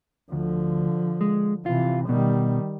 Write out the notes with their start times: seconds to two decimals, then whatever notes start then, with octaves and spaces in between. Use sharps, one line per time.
0.32 D2 D3 F3
1.21 G#3
1.66 C3 E3 F4
2.09 B2 D#3 G3